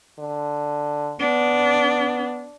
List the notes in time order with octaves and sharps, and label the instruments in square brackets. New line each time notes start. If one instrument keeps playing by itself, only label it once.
[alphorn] D3
[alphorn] B3 [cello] D4